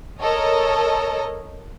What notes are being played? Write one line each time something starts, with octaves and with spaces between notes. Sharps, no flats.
A4 A#4 C#5 D#5